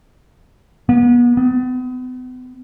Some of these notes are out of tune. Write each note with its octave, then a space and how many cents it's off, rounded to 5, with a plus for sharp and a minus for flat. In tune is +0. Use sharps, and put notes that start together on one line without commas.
B3 -35
B3 +40